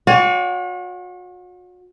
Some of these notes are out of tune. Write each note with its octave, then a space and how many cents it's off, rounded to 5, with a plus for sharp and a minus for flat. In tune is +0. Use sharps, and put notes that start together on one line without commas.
F#4 -40 C#5 +40 G5 +0